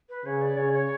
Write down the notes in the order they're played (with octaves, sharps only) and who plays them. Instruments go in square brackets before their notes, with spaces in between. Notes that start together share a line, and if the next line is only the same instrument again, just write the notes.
[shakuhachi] B4
[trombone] C#3 [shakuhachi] C#5
[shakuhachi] D5
[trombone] C#3 [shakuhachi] C#5
[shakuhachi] C#5